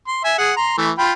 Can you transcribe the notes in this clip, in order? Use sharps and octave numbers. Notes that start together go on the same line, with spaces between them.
C6
E5 G#5
G#4 F#5
A#5 C6
E3 A3
F4 G5 B5